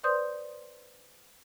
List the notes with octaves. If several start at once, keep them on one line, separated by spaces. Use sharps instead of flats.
B4 C5 D5 C6 D#6 G6